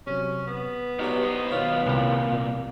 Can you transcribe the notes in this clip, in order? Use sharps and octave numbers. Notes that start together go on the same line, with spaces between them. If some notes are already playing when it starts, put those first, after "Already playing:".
C3 F#3 C#4
B3
B2 F#3 D#4 G4 D5
C5 D#5
B1 B2 D#3 F4 C#5
C2 A#2 F4